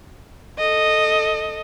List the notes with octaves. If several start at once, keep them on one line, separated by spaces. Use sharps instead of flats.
A4 D#5